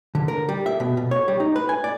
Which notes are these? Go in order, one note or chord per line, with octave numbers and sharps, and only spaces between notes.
D3
A#4
G3
E5
B2
B2
C#5
G3
D#4
B4
G#5
D5